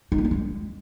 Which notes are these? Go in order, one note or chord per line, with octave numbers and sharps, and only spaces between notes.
D#4
A#3
D4
G#3